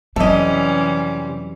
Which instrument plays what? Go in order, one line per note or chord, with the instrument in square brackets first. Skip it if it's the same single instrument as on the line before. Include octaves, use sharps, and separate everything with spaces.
[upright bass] F2 F#3 [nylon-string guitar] C3 [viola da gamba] E3 G3 C#4 [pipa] A4 D#5